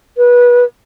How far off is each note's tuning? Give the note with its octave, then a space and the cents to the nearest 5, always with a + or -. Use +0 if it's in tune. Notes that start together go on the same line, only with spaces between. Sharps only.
B4 -25